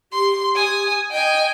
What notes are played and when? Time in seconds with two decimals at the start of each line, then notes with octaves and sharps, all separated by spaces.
0.12 G4 C6
0.55 G#5 D#6
1.11 D#5 G5 G#5